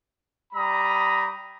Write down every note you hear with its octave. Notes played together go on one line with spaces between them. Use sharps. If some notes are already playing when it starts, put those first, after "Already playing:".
G3 A#5 B5 D#6